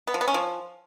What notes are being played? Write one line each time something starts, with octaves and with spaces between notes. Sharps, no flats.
B3
F3
B3
C#4
F3